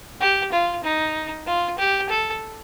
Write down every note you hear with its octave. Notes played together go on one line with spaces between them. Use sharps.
G4
F4
D#4
F4
G4
A4